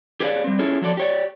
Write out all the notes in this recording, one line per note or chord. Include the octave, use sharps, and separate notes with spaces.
G4 G#4 B4 C#5 D5 F5
G3 C4
C#4 E4 F4 G#4 A4 C#5
F3 F#3 A4 D5
G4 C#5 D5